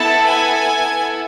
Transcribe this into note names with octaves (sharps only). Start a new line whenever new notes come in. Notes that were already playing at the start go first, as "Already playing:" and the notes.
Already playing: B3 E4 A4 A5
G#5